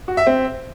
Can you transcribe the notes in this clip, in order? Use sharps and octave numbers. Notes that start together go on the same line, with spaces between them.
F#4
E5
C4